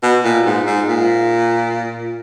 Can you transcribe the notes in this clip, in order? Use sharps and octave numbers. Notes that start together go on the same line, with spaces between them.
B2
A#2
G#2
G#2
A#2